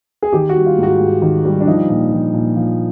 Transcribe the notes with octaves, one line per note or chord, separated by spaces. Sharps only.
G#4
D#3 G4
F#4
G3
F4
G#2
F#4
G#2
D#3
G3
D4
F3 D#4
A#2
F3
A#2
F3